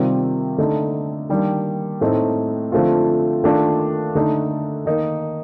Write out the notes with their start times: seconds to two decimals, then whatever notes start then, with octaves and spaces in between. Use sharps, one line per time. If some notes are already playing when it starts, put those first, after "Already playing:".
Already playing: C3 D#3 G3 C4 F4
0.58 D3 A3 D#4
1.30 D#3 G3 A#3 D4
2.01 A2 A3 C4 D#4
2.72 D3 F3 A3 C4 F4
3.44 D#3 A3 D4 F4
4.15 D3 A3 D#4
4.86 D#3 A#3 D#4